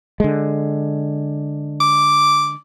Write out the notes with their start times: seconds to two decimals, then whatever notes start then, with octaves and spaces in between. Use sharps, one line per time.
0.20 D3 G#3
1.80 D6